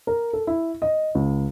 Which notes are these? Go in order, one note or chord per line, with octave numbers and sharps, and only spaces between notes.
A#4
A4
E4
D#5
C#2